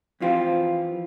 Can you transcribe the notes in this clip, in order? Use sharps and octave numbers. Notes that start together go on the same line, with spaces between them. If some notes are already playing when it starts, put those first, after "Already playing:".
F2 E3 F4 G4 C5